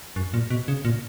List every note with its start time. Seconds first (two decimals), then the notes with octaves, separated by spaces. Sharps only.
0.16 F#2
0.34 A#2
0.50 B2
0.68 C#3
0.85 A#2